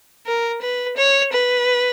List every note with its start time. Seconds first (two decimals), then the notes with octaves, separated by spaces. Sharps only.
0.26 A#4
0.62 B4
0.97 C#5
1.33 B4